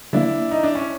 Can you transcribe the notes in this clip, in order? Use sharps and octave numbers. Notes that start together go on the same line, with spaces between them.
D3 F#3 A#3 D4 E4
D#4
D4
C#4